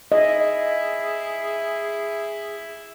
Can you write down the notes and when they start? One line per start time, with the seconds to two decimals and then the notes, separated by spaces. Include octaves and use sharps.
0.12 E4 G#4 D#5